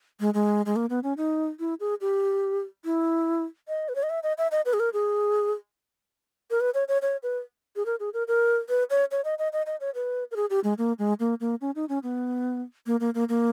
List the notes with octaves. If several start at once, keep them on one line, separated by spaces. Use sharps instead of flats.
G#3
G#3
G#3
A#3
B3
C#4
D#4
E4
G#4
G4
E4
D#5
B4
C#5
D#5
E5
D#5
E5
D#5
B4
G#4
A#4
G#4
A#4
B4
C#5
C#5
C#5
B4
G#4
A#4
G#4
A#4
A#4
B4
C#5
C#5
D#5
D#5
D#5
D#5
C#5
B4
A#4
G#4
G4
G#3
A#3
G#3
A#3
A#3
C#4
D#4
C#4
B3
A#3
A#3
A#3
A#3